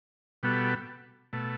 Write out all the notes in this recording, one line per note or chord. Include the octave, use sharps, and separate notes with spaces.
B2 G3 B3 F#4 A4
B2 A3